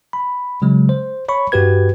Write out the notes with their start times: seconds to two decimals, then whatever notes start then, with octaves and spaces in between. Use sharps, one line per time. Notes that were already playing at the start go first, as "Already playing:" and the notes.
0.13 B5
0.62 C#3 F#3 G#3
0.89 C5
1.28 C#5 B5 C#6
1.52 G2 F#4 G4 B4 G#6